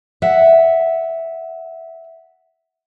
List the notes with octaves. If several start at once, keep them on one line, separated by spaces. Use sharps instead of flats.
E5 F#5